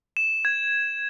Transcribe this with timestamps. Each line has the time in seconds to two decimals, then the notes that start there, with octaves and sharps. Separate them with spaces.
0.17 E7
0.45 G#6